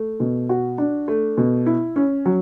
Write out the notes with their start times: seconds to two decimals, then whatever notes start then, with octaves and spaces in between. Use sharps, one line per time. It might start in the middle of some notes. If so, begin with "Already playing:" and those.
Already playing: A3
0.20 B2
0.49 F#4
0.78 D4
1.08 A3
1.37 B2
1.66 E4
1.96 C#4
2.26 F#3